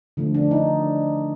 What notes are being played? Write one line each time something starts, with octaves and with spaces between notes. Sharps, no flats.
D3 F3 A3
D4
D#4